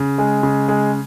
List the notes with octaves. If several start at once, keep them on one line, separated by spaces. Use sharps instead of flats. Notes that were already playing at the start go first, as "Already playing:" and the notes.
Already playing: C#3
G#3
C#3
G#3